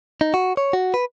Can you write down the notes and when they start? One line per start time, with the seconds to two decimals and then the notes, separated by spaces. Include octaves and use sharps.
0.21 D#4
0.34 F#4
0.57 C#5
0.73 F#4
0.94 B4